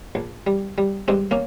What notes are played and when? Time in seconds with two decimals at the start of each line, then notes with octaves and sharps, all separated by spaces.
0.15 A#1
0.47 G3
0.78 G3
1.08 G2 G#3 C4
1.31 A#3 C#4